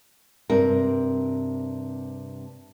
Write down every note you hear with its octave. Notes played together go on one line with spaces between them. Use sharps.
G2 C3 C4 A#4